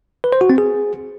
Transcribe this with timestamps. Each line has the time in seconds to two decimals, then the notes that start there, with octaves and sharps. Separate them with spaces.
0.24 B4
0.32 C5
0.41 F#4
0.50 C4
0.58 G#4